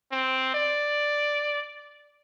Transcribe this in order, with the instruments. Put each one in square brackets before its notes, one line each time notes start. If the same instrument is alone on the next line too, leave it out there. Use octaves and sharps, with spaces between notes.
[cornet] C4
D5